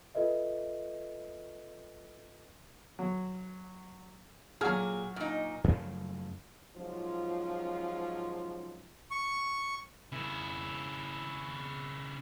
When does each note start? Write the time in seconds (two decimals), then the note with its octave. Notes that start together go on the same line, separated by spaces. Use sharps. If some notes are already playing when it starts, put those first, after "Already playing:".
0.15 F4 A4 B4 D#5 E5
2.99 F#3
4.61 A#2 F#3 F#4 G#4 F6
5.16 A#2 D#4
5.64 F#2 C#3 F3 A3
6.77 G#2 F3 F#3 C#4 F4
9.11 C#6
10.12 C#3 E4